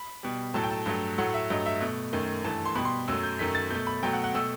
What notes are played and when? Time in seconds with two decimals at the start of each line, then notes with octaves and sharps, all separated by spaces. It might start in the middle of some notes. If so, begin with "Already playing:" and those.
Already playing: B5
0.23 B2 G3
0.54 A2 F#3 A3 A5
0.63 G5
0.71 A5
0.86 G2 F#3 A3
1.18 A2 F#3 A3 F#5
1.34 E5
1.50 G2 F#3 A3 D#5
1.66 E5
1.81 B2 A3
2.13 F#2 D#3 A3
2.45 G2 E3 A3 A5
2.65 C6
2.76 B2 G3 B5
2.85 C6
3.08 F#2 F#3 A3 E6
3.23 G6
3.39 F#2 D#3 F#3 A3 B6
3.55 A6
3.70 B2 A3 G6
3.87 B5
4.03 B2 F#3 A3 G5
4.13 F#5
4.24 F#5
4.34 B2 A3 E6